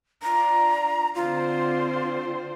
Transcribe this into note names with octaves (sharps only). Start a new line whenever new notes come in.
D4 F4 A#5
D3 C4 F4 C5